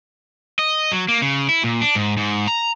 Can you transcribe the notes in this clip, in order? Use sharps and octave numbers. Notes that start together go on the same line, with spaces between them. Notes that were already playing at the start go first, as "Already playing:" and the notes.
D#5
F#3
A#3
C#3
E4
A#2
D4
G#2
G#2
A#5